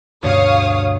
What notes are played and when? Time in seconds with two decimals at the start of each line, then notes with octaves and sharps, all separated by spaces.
0.23 D2 G2 B2 C#5 F5 D#6